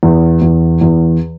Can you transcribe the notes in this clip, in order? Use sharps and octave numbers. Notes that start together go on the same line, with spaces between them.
E2
E2
E2